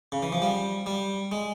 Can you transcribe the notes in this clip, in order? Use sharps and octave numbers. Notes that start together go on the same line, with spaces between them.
C#3
E3
F3
G3
G3
G#3